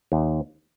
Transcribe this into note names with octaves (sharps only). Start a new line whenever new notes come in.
D#2